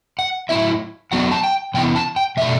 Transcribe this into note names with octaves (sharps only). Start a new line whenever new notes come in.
F#5
A2 F#3 C4 E4 E5
F#3 B3 D4 F#5
A5
G5
C3 E3 B3 E4 G5
A5
G5
B2 A3 D4 E5